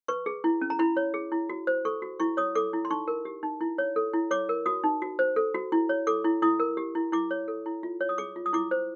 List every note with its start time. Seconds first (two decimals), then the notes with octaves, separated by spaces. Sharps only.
0.08 B4 C#6
0.26 G#4
0.44 E4
0.61 C#4
0.70 A#5
0.79 E4 B5
0.97 C#5
1.14 G#4
1.32 E4
1.50 F#4
1.67 C5
1.85 A4 C#6
2.02 F#4
2.20 E4 C#6
2.37 C#5 D#6
2.55 A4 D6
2.73 E4
2.85 C6
2.90 D#4 C#6
3.08 A#4
3.25 G4
3.43 D#4
3.61 E4
3.78 C#5
3.96 A4
4.13 E4
4.31 C#5 D6
4.49 A#4
4.66 F#4 D#6
4.84 D#4
5.02 F#4
5.19 C5
5.36 A4
5.55 F#4
5.72 E4
5.89 C#5
6.07 A4 D6
6.25 E4
6.42 E4 D#6
6.60 A#4
6.77 G4
6.95 E4
7.12 E4 D6
7.31 C#5
7.48 A4
7.66 E4
7.83 F4
8.01 C#5
8.09 D#6
8.18 G#4 D6
8.36 F4
8.46 D#6
8.53 E4 D6
8.71 C5